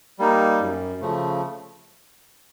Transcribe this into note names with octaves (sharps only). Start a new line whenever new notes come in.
G3 A#3 D#4
F#2
C#3 F3 A3